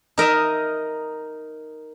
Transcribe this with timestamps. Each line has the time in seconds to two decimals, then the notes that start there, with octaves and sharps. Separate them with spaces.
0.18 D#4 A#4 D#5 E5